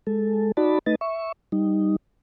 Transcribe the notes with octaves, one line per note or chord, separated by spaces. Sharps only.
G#3 A4
D#4 F#4 D5 A5 B5
A3 D#4 B4 D#5 A6
E5 C#6
G3 D#4